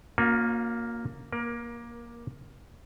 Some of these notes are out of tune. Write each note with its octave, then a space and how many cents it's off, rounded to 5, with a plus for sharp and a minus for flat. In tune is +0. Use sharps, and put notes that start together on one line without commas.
A#3 +0 C#4 -5 F4 +45
A#3 +15 A#4 +30